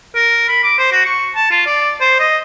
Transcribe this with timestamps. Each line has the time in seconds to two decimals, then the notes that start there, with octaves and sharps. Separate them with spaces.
0.15 A#4
0.49 B5
0.64 D6
0.78 C5
0.92 F#4
1.05 C#6
1.36 A5
1.51 F4
1.66 D5
2.01 C5
2.20 D#5